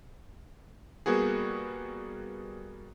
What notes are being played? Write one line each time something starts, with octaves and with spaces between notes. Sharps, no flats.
G3 A#3 B3 F#4 G#4